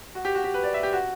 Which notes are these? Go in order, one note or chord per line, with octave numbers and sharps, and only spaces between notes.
F#4
G4
F#4
G4
B4
D5
E5
G4
F#4